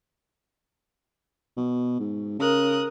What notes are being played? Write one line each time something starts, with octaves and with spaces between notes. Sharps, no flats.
B2
G#2
C#3 A#4 D#6 F#6